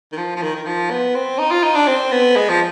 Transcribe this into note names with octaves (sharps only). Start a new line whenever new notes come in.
D#3
F3
F3
D#3
D#3
F3
B3
C4
D#4
F4
D#4
D4
C4
B3
G#3
F3